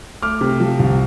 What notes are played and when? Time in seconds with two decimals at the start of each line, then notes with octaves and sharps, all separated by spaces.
0.22 A3 D6 F6
0.41 C3
0.60 F3
0.79 C2